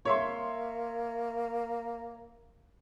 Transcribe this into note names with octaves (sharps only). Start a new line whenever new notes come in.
A#3 C#5 E5 C6